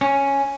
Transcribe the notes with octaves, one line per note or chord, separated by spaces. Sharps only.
C#4